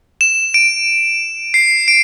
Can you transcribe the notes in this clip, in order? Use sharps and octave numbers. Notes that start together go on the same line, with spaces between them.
E7
D7
C7
D7